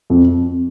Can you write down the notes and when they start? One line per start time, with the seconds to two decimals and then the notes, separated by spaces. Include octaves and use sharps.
0.10 F2